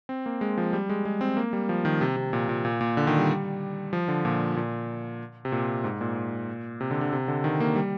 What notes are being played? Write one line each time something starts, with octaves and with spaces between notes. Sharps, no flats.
C4
A#3
G#3
F3
G3
G#3
G#3
C4
A#3
G3
F3
D#3
C3
C3
A#2
A#2
A#2
A#2
D3
D#3
G3
F3
D3
A#2
A#2
C3
A#2
G#2
A#2
C3
D3
D3
C3
D3
D#3
A#3
G3